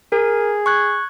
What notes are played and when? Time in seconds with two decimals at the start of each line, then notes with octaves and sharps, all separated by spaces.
0.12 G#4 A#4
0.66 C#6 F#6 G#6